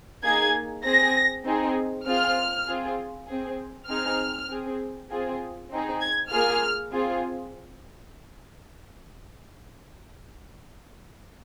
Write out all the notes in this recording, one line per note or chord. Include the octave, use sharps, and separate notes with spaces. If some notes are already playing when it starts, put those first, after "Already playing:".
A#3 D#4 G#4 G#6
C4 G#4 A#6
C4 D#4 G#4
C4 F4 G#4 F6
C4 F4 G#4
C4 G#4
C4 D#4 G#4 F6
C4 G#4
C4 F4 G#4
C4 D#4 G#4
G#6
A#3 F4 G#4 F6
C4 F4 G#4